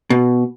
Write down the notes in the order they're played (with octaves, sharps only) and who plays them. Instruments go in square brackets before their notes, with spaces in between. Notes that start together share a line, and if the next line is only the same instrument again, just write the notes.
[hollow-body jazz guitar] B2